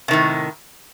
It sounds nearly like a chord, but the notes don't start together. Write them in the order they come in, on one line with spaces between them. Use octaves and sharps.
C3 D#3 A2